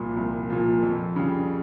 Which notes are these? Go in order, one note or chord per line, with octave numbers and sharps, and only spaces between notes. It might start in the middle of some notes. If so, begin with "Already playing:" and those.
Already playing: C2 A#2 F3
C2
A#2 F3
F2
C#3 G3